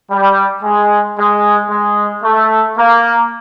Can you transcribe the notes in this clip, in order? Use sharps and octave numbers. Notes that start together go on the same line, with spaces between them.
G3
G#3
G#3
G#3
A3
A#3